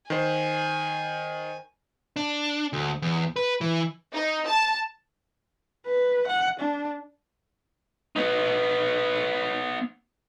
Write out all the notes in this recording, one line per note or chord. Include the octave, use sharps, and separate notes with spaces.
D#3 C5 G#5
D4
D2
E2
B4
E3
D#4
A5
B4
F#5
D4
B3 D#4